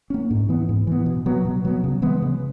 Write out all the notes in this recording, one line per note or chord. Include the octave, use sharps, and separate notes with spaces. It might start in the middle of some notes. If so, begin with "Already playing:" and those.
A#3 C#4
G#2
E3 B3
G#2
E3 B3
B2
F#3 B3
B2
F#3 B3
C#3
E3 G#3 B3
C#3